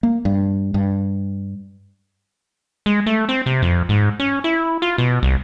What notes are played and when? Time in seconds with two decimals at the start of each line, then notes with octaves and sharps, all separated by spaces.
0.03 A#3
0.25 G2
0.74 G2
2.86 G#3
3.06 A3
3.29 C4
3.46 C3
3.62 F2
3.89 G#2
4.20 C#4
4.44 E4
4.82 F4
4.98 B2
5.23 C2